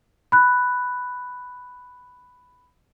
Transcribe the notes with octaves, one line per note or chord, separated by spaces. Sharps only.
B5 F#6